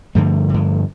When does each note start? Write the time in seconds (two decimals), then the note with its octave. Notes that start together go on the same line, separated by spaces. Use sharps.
0.15 G2 D3 F3 A3
0.49 G2 D3